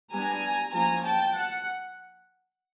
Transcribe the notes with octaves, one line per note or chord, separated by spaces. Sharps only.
G3 B3 D4 G#5 A#5
F3 A#3 C#4 G#5 A#5
G5 A5
F#5